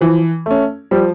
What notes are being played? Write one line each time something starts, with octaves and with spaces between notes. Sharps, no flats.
E3 F3
A3 C#4
F3 G3